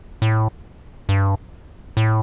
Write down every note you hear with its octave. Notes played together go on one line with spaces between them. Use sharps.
A2
G2
A2